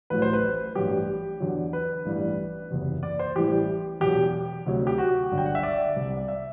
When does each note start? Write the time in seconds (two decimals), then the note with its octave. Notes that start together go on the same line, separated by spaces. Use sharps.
0.10 A1 A2 F#3 B4
0.22 C5
0.33 B4
0.75 A1 G2 F#3 G4
1.40 E2 D3 F#3
1.73 B4
2.06 A1 G2 E3 G3
2.70 F#1 E2 C3
3.03 D5
3.19 C5
3.36 A1 A2 E3 G3 G4
4.00 E1 E2 B2 F#3 G4
4.66 D2 C3 F#3
4.87 G4
4.98 F#4
5.31 G1 G2 D3 F#3
5.38 G5
5.46 F#5
5.55 E5
5.63 D5
5.96 C2 C3 G3
6.17 D5
6.28 E5